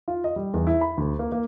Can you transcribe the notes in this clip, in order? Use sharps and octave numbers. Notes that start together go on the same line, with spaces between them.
F4
D#5
G3
E2
E4
B5
D2
A#3
A#3